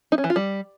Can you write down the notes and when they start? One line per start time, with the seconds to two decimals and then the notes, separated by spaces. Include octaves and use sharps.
0.12 D#4
0.18 C#4
0.24 E3
0.30 F4
0.36 G3